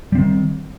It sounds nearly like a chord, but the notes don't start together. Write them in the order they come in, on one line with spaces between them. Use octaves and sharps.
G3 C4 D#3